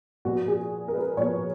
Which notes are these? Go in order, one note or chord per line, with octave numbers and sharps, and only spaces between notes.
A#2 F3 B3 F#4
G#4
A#4
B4
A#2 F3 B3 C#5